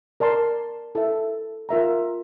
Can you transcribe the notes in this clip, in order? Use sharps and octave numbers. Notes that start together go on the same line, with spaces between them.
A#4 D5 A5 C6
E4 A4 E5
F4 A#4 E5 A#5